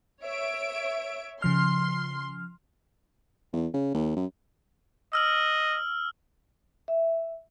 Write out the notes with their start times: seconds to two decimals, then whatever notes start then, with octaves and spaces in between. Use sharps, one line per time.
0.22 C#5 E5 D7
1.42 C#3 F3 C6 F6
3.53 E2
3.74 C#3
3.94 D#2
4.16 F#2
5.13 D#5 E6 F6 F#7
6.88 E5